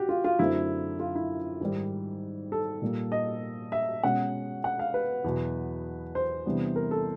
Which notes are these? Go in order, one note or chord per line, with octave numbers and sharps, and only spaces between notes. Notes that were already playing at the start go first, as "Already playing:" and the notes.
Already playing: F#4 G4
F4
F4
F#2 D3 F#3 A3 C4 E4
F4
E4
G#2 D#3 G3
A4
A#2 G3 A#3
D#5
E5
B2 G#3 C#4 F#5
F#5
F5
B4
E2 B2 F#3
C5
C3 E3 G3 B3 D4
A#4
A4